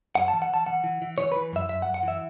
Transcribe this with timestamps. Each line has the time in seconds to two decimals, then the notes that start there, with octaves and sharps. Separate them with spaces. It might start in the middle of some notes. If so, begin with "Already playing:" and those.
0.15 F#2 F#5
0.28 A5
0.34 E3
0.42 F#5
0.50 E3 A5
0.66 E3 F#5
0.84 E3
1.02 E3
1.18 E3 C#5
1.32 B4
1.36 E3
1.53 F#2 E5
1.69 F#2 E5
1.82 F#5
1.86 F#2
1.94 F#5
2.03 E3 E5